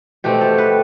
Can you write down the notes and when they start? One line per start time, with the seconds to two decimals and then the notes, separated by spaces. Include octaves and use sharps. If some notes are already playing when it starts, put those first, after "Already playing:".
0.24 B2 A3 C4 G4
0.41 A4
0.58 B4